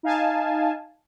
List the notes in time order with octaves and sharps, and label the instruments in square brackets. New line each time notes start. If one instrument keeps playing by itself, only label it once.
[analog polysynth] D#4 F5 G#5 A5